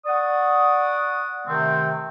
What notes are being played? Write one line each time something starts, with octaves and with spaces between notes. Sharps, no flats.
D5 F#5 C#6 D#6
C3 D#3 A3 C4